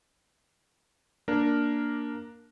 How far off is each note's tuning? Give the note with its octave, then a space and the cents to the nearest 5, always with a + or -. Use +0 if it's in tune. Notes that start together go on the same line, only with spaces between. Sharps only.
A#3 +0 D4 +0 A#4 +0